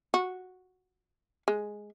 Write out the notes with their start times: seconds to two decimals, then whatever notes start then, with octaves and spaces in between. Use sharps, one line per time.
0.14 F#4
1.48 G#3